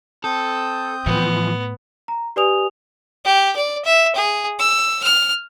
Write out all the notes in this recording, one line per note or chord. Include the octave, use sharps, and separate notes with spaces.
C4 A4 D#6 G6
A2 E3 F3 B3
A#5
G4 B4 D5 G#5 D#6 F7
G4
D5
E5
G#4
E6
F6